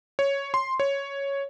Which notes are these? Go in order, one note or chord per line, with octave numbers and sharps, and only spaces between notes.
C#5
C6
C#5